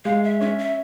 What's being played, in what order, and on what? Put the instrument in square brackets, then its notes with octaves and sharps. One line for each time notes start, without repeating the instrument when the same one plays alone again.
[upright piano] G#3 [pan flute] F5
[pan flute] E5
[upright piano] C#4 [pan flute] E5
[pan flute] E5